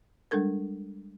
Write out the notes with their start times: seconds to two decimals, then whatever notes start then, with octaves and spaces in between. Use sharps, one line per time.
0.31 G3 G#3 D4 A4 A#4